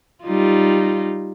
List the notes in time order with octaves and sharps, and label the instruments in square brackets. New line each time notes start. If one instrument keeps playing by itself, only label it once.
[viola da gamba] G3 D#4 F4